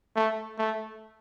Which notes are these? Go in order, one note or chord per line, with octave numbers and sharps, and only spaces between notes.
A3
A3